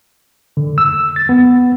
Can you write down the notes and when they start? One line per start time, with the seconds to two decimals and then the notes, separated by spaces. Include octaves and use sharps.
0.57 D3
0.78 E6
1.16 A6
1.29 B3